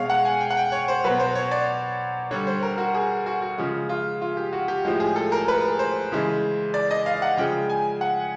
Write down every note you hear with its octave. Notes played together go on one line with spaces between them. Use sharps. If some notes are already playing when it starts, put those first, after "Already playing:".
Already playing: B2 G#3 C#5 F5
F#5
G#5
G5
F#5
G5
C#5
C5
B2 F#3 B4
C5
C#5
D5
D3 G3 C#5
C5
A#4
F#4
G#4
F#4
F#4
C#3 F3 G#3
F4
F4
G4
F#4
G4
A2 F3 G#3 G4
G#4
A4
A#4
B4
C5
C#3 E3 G#3
D5
D#5
F5
F#5
C#3 F3 G#3 G5
G#5
F#5